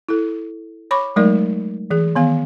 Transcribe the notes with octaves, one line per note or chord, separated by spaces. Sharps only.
E4 A4
C#5 B5 C#6 D6
F#3 G#3 A3 D#4 A#4 D5
E3 G#4
D#3 B3 F5